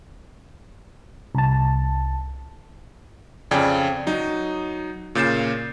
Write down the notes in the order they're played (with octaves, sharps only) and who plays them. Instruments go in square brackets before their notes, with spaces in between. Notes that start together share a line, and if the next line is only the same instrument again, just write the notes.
[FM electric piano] C2 A5
[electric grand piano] F2 C#3 D5 G5 G#5 G#6
F#3 D#4
A#2 C#3 G6 A6 C7 E7